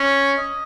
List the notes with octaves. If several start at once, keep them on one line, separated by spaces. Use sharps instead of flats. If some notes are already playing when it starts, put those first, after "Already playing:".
Already playing: C#4 C#5
D#5